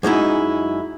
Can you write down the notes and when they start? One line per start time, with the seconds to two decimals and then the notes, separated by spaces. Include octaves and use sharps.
0.03 F#2 G#3 D#4 E4